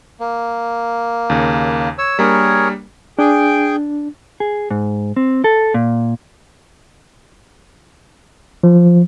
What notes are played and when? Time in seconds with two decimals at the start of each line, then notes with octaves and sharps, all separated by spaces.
0.20 A#3
1.30 D#2 C#3
1.98 C#5 E6
2.19 G3 A#3 D4 G#4 A#4 C#5
3.19 D4 G#4 G5
4.40 G#4
4.71 G#2
5.17 C4
5.44 A4
5.74 A#2
8.63 F3